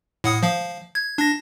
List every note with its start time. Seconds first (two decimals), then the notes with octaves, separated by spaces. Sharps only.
0.24 A2 F#5 D#6
0.43 F3 F5
0.95 G#6
1.18 D4 A#6